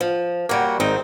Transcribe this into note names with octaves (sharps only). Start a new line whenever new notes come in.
F3
G3 A#3 F#4 C#5 G5
G#1 C4 D#4 G5